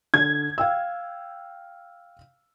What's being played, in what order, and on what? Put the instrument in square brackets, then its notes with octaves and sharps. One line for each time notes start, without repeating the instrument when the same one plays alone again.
[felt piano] D3 [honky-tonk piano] G#6
[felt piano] F5 G5 E6